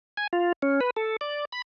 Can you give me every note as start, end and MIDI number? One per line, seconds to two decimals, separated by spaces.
0.17 0.27 80
0.33 0.52 65
0.62 0.80 61
0.81 0.90 71
0.96 1.16 69
1.21 1.45 74
1.52 1.62 83